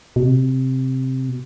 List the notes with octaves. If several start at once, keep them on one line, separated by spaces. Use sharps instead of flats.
B2
C3
B2